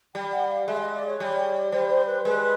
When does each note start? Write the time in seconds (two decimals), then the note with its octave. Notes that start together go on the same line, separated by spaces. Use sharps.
0.15 G3 G5
0.32 F#5
0.50 F5
0.68 G#3 E5
0.80 D#5
0.94 D5
1.07 C#5
1.20 G3
1.72 G3 C5
1.90 C5
2.07 B4
2.25 G#3 B4